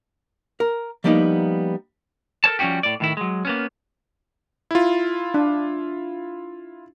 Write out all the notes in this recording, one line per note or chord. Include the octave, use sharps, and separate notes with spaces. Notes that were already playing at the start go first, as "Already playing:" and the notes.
A#4
F3 G3 A#3 B3 C#4 D#4
A4 A#4 C#5 A5
F3 G3 C#4 D#4 F#4 G4
A2 D5
A2 D#3 E4
F#3 G#3
A#3 B3 C#4
E4 F4
D4